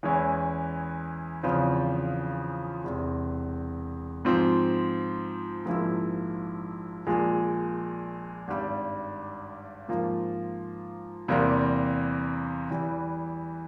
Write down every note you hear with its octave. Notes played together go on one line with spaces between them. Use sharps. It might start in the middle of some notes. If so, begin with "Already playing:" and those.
E2 E3 G#3 C#4 E4
E2 C#3 F3 C4 F4
E1 E2 C3
G#2 F3 C4
A#1 G#2 F3 A#3 E4
A#1 A#2 G#3
G#1 G2 G3
G#2 F3 A#3 F4
E2 C3 G3 A#3
E2 E3 G3